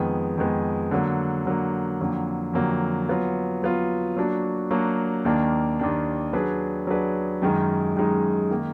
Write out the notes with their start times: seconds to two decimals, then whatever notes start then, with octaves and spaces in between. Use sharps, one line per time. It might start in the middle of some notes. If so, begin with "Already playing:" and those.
Already playing: F2 D#3 G#3 B3
0.38 F2 D#3 G#3 B3
0.91 D3 F#3 A#3
1.45 D3 F#3 A#3
2.00 F2 D3 F#3 A#3
2.54 F2 D3 F#3 A#3
3.09 F#3 B3 F4
3.63 F#3 B3 F4
4.17 F#3 A#3 D4 F#4
4.71 F#3 A#3 D4 F#4
5.25 D#2 D#3 A#3 D4
5.79 D#2 D#3 A#3 D4
6.33 F#3 D4 G#4 B4 D5
6.87 F#3 D4 G#4 B4 D5
7.42 F#2 D#3 G#3 D#4
7.97 F#2 D#3 G#3 D#4
8.51 D#3 A#3